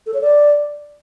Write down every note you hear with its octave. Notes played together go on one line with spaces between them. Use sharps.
A4
C#5
D5